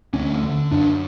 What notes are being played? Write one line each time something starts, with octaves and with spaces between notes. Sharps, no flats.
D2 C#4
D3
F#2 D4